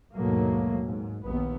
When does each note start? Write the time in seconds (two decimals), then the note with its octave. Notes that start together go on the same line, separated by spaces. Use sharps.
0.16 D#2 G#2 B2 F#3 A3 A#3
0.83 G#2
1.25 A#1 D#2 B3